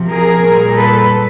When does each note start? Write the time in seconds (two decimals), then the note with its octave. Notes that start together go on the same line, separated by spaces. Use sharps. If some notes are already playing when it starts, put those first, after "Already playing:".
Already playing: C3 F3
0.10 G#4 A#4
0.43 A#2 G3
0.77 A4 B4